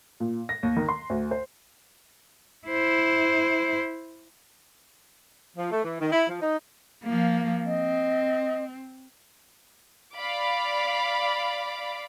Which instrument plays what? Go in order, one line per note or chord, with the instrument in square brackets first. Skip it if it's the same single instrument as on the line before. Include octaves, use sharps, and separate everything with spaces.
[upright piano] A#2
A#6
D#2
D#3
C6
D2
C5
[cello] E4 C5
[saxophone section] F3
A3
E3
D#3
E4
F3
D#4
[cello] F3 A#3
[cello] C4 [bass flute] D#5
[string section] D5 F5 B5 D6